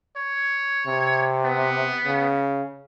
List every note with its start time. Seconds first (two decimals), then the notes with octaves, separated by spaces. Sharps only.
0.17 C#5
0.87 C3
1.45 B3
2.05 C#3